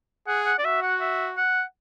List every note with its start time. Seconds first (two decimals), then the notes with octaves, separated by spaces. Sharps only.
0.27 G#4 F#5
0.46 F#5
0.59 D5
0.65 F#4 E5
0.82 F#5
1.01 E5
1.37 F#5